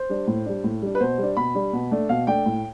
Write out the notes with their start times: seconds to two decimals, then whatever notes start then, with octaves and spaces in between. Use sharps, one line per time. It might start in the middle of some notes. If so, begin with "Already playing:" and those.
Already playing: C5
0.09 G3 D4
0.27 A2
0.46 G3 D4
0.64 A2
0.82 G3 D4
0.95 B4
1.00 B2 C5
1.18 G3 D4
1.37 B2 B5
1.55 G3 D4
1.73 B2
1.91 A3 D4
2.09 B2 F5
2.27 A3 D4 G5
2.46 A2